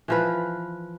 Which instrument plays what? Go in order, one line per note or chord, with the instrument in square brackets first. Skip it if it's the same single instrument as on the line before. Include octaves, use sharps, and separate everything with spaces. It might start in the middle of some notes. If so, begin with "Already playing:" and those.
[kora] E3 F3 B4